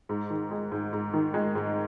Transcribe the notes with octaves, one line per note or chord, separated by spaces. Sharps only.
G#2
D#3
G#3
G#2
G#2
D#3
G#3
G#2